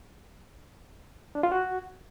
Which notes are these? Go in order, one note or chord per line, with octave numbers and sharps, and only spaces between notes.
D4
F4
F#4